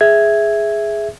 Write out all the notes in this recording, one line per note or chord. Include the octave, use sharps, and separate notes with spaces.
G#4 E5 G#6